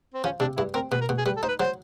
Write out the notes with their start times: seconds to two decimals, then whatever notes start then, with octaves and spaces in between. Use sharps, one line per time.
0.14 C4
0.24 F3 C#4
0.40 C3 D4
0.57 G2 E4
0.74 C4 A#4
0.92 B2 B4
1.01 A#4
1.09 B2
1.18 G#4
1.26 G3 B4
1.37 A4
1.43 D#4 C5
1.48 B4
1.60 F#3 C5